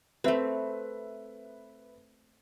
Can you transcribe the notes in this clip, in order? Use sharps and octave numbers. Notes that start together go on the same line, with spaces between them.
A3 C4 B4 E5